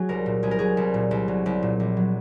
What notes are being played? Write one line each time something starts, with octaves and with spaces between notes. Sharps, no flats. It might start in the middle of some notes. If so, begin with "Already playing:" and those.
Already playing: F#3 F#4 G#4
C2 A#4
A#2
C2 G#4
A#4
F#3 G#4
C2
A#2
C2
F#3
C2
A#2
A#1
F#3